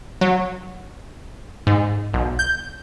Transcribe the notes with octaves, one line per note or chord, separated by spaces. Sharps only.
F#3
G#2
B1
G6